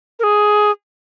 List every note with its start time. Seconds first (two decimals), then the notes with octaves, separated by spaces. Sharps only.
0.19 A#4
0.23 G#4